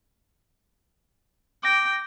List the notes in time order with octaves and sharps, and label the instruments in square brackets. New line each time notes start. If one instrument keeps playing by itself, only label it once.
[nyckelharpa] G5 [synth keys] D6 A#6